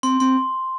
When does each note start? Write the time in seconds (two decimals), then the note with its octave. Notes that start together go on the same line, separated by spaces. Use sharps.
0.03 C4 C6
0.20 C4 C6